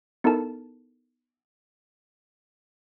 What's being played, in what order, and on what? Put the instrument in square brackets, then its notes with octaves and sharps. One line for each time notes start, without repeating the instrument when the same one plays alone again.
[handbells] B3 D#4 E4 A4 A#4 A5